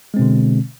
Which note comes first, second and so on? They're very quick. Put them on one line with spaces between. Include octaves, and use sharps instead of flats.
G#3 C4 B2 D3